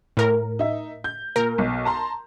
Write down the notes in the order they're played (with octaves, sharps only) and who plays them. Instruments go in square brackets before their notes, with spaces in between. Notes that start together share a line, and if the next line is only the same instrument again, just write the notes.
[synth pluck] A2 A#4
[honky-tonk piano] D#4 E5
G6
[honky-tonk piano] A#2 [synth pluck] A#4
[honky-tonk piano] B1
A5 A#5 C6